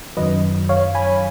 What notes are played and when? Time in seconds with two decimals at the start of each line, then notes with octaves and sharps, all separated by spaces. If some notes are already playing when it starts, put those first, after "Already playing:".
0.17 F#2 D#3 F#3 B4 D#5
0.69 C#5 F5
0.95 G#5 B5